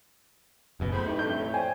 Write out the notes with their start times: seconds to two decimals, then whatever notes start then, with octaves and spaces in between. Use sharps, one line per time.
0.80 F#1 F#2 B2
0.92 A2 G#4 C5 B5
1.07 F2 A3 D#4 G4 B4
1.19 G2 G6
1.40 C#5
1.54 C5 D5 G5 G#5